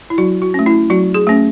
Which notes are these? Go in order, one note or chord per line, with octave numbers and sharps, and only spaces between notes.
E4
F#3 F#4
F#4
A3 C#4
E4
F#3 F#4
G#4
A3 C#4